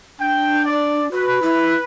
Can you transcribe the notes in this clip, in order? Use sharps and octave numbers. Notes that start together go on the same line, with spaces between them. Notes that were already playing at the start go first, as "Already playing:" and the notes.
D4 G5
D5
F#4 B4
E4